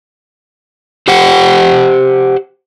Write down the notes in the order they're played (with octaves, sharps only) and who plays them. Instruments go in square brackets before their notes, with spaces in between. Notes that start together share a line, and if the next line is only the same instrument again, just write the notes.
[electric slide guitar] G4 C5 F#5 G5